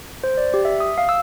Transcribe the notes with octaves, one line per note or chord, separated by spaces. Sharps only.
C5
D5
G4
E5
D#6
F5
E6